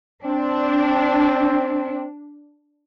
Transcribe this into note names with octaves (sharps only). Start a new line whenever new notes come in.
C4 D4